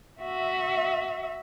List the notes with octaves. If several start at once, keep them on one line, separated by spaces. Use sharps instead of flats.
F#4 E5